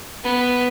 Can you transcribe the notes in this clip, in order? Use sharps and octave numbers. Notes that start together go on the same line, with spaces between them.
B3